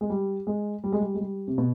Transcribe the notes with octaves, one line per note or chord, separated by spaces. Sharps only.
G#3
G3
G#3
G3
G#3
G3
G#3
G3
C3
B2